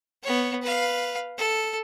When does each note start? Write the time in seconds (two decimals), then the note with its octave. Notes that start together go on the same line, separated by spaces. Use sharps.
0.23 B3 C#5
0.62 B4 F5
1.38 A4